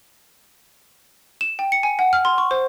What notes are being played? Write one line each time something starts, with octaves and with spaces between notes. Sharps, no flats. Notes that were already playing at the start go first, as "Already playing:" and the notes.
E7
G5
C#7
G#5
F#5
F6
C6
C#6
C5